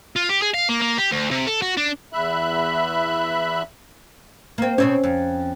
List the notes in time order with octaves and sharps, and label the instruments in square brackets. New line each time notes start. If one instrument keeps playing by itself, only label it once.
[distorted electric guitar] F4
G4
G#4
F5
A#3
A#3
G4
D2
C3
A4
F#4
D4
[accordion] E2 E5 B5 F#6
[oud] A#3 C4
[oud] B2 C4 C#5 [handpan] C#4
[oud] F2